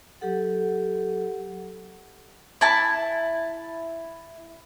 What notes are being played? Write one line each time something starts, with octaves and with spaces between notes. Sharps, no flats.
F#3 G4 A4 F#5
E4 A5